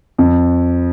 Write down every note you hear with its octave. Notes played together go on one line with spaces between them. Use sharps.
F2